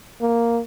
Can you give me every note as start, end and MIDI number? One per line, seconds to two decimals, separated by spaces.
0.21 0.61 58